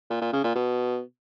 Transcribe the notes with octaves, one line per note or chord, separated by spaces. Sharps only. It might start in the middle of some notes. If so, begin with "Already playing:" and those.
A#2
A#2
C#3
A#2
B2